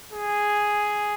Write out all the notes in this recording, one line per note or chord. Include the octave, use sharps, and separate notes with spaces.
G#4